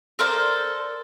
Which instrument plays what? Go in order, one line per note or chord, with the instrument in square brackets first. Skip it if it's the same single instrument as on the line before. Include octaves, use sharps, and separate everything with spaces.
[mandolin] A4 A#4 C5 D5